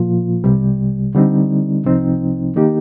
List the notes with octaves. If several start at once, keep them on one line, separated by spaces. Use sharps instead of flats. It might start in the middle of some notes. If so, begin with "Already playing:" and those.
Already playing: A#2 F3 A#3 F4
C2 C3 G3
D3 G3 C4 D#4
C2 C3 F3 C4 D#4
D#3 A#3 D#4 G4